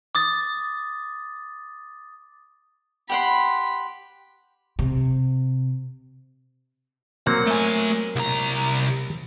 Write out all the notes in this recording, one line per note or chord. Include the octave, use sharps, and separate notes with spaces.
D6 D#6 A6
G4 F#5 B5 C6
C3
F#3 A#3 C4 F#5
A3 G#5
C2 A#5